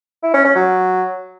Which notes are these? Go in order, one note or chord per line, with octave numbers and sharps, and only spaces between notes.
E4
C#4
C#4
F#3